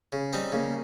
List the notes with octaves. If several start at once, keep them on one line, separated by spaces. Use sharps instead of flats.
C#3
G3 C4 D#4
C#3 A#3